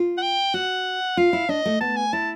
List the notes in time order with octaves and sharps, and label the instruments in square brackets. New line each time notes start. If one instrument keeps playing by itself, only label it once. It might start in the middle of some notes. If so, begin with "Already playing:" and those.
Already playing: [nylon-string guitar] F4
[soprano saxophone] F#5
G5
[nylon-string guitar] F#4 [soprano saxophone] F#5
[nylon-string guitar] F4 [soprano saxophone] F5
[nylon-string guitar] E4
[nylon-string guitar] D4 [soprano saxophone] D#5
[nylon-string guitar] A3
[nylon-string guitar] B3 [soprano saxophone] A5
[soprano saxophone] G#5
[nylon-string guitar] E4 [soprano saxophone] A5